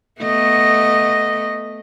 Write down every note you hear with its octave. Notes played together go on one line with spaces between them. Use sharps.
A3 B3 D#5